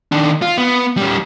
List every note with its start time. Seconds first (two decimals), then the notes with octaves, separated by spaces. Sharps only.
0.12 D#3 D4
0.42 F4
0.58 B3
0.97 G3 C#4